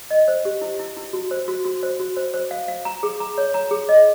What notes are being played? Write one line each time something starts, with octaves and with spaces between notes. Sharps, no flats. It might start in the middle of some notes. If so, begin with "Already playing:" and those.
D#5
C5
G4
E4
E4
E4
F#4
C5
F#4
F#4
C5
F#4
C5
C5
F5
F5
A#5
G#4
A#5
C#5
A#5
G#4
D#5